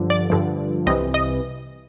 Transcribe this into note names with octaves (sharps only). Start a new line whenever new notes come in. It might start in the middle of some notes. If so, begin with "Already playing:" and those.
Already playing: G2 D3 F3
D5
G2 D3 F3
C2 C3 E3 D#5
D#5